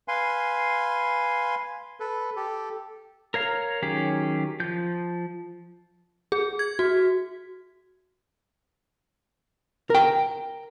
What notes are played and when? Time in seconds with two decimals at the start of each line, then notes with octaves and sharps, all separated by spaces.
0.08 B4 F5 G#5 C6
2.00 A4 B4
2.36 G4 A4
3.34 A#4 C#5 F5 A#5
3.82 D#3 F#3 C#4 G4 G#4
4.60 F3 G6
6.32 G#4
6.59 G#6
6.79 F#4
9.90 A#4 G5